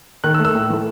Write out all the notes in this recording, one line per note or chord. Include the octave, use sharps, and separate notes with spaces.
D#3 F#6
E6
A3
E6
A2
E3 A3